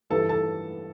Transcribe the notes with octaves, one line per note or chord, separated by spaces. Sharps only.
G2 E3 B3 E4 A4 A5
A4 A5